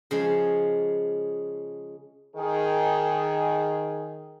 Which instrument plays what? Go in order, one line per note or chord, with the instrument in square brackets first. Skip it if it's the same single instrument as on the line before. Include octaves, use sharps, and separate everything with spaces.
[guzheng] C#3 F3 G#3
[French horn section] D#3 G#4